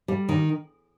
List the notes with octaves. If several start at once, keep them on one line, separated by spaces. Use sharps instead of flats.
G3
D#3